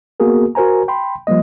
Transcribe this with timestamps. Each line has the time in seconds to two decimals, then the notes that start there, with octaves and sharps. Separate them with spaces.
0.20 A#3 B3 F#4 G#4 A#4
0.55 F#4 A#4 C5 G#5 A#5
0.88 G5 B5 C6
1.27 F3 G3 A#3 D#5